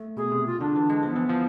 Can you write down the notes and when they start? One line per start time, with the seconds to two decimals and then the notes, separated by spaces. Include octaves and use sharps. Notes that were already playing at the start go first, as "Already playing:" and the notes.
Already playing: A3
0.17 B2 G#4
0.32 C3
0.46 F4
0.61 D3 D4
0.76 E3
0.90 G#3
1.03 F3 B3
1.16 E3
1.29 F3